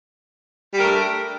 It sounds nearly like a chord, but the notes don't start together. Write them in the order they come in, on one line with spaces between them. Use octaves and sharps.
G3 G4 A#4 A3 D4